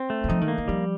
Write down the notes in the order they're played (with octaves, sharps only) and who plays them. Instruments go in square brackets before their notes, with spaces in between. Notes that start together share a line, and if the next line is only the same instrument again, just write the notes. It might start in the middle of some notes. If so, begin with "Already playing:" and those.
Already playing: [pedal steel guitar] C4
A3
[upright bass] D#3
[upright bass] F3 [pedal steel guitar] D#4
[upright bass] D#3
[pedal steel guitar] A#3
[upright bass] D#3
[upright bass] F3 [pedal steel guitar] G3